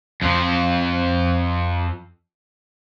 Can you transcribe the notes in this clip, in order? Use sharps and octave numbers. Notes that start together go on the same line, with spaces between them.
F2 F3